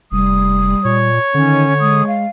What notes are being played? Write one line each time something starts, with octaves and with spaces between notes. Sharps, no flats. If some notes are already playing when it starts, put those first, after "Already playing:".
F1 G3 D#6
A#2 C#5
D3 D#3 C#4
G#3 D#6
F5